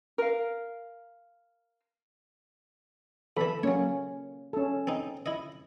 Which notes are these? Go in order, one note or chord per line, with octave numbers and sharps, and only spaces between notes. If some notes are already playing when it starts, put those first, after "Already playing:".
A#4 F5
E2 E3 A4 B5
F#3 A#3 C#4 C#5
C#4 A4
C4 D#4
E4 D#5